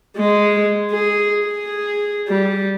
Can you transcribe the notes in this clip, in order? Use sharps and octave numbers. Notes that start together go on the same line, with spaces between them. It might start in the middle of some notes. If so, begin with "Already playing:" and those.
G#3
G#4
G#4
G3